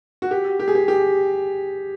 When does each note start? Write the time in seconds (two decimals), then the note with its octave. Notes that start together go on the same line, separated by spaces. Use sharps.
0.22 F#4
0.31 G4
0.59 G4
0.68 G#4
0.75 G4
0.88 G4